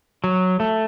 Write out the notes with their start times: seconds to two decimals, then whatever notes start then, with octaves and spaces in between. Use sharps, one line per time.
0.24 F#3
0.60 A3